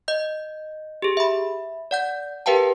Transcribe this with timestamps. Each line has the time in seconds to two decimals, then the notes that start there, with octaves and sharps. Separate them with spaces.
0.08 D#5 G6
1.02 G4 G#4
1.17 E5 B5
1.91 D5 F#5 G6
2.46 G4 A#4 B4 F5 G5 A5